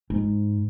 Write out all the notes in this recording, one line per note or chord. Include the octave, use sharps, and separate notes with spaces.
G#2